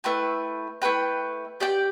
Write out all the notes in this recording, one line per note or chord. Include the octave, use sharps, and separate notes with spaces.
A3 E4 B4 G5
A3 E4 B4 G5
G4 D5 G5